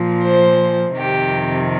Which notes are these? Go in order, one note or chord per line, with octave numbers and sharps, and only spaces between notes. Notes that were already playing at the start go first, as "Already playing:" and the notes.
Already playing: A#2 F3
C5
F2 C3 D#3 G4